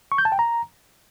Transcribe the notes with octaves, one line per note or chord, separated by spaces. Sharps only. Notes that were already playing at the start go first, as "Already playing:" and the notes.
C#6
G6
A5
G5
A#5